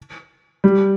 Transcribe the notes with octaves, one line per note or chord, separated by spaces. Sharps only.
G3